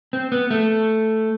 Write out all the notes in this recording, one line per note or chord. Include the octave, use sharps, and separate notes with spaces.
C4
B3
A3